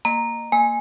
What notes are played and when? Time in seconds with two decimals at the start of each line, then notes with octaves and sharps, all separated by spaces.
0.05 A#3 A#5
0.52 A#3 G#5